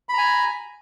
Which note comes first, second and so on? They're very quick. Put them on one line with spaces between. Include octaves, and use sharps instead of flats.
B5 A#5 G#5